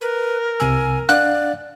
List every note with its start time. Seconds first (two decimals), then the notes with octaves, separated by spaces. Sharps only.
0.01 A#4 B4
0.60 C2 C3 G#5 E6
1.09 D4 D5 F5 F#5 F#6